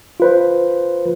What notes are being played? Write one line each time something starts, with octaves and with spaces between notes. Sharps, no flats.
F4 B4 C5